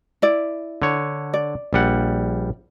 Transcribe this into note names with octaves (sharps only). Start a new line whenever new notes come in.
E4 D5
D3 C#5
D5
A#1 G3 F#5